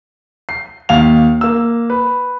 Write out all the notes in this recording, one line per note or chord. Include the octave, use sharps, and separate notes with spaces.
C7
D#2 F5 F7
A#3 E6
B4